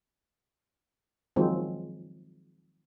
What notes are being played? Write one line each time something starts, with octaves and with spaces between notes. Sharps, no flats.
D#3 F3 F#3 G#3 C4